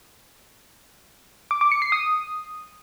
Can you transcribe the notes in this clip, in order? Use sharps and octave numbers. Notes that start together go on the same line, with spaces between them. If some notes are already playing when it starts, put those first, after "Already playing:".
D6
D6
C#7
C7
D#6